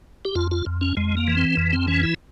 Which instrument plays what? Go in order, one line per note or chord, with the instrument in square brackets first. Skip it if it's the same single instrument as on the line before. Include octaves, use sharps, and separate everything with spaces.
[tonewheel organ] G4
F2 F4
F4
F2
C#4
F2 G#3
A#3
E3
C4
F2
C4
E3 C#4
E4